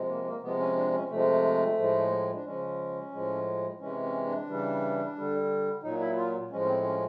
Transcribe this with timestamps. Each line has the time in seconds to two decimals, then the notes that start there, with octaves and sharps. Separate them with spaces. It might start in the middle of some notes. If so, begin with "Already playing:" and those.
Already playing: C3 F3 G#3
0.08 A#3
0.25 A#3
0.41 C3 F3 G#3 B3
0.59 C#4
0.76 D4
0.92 C#4
1.09 C3 F3 G#3 A3
1.77 A2 F3 G#3
2.34 D4
2.45 C#3 F3 G#3 C#4
3.12 A2 F3 G#3
3.80 C3 E3 G#3 C#4
4.02 C#4
4.25 D4
4.47 C#3 E3 G3
5.15 D3 G3
5.83 A#2 F#3 D#4
6.00 E4
6.17 F4
6.50 A2 F3 G#3 C#4
6.61 C#4
6.66 C4
6.83 C#4